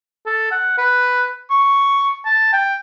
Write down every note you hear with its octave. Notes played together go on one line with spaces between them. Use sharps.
A4
F#5
B4
C#6
A5
G5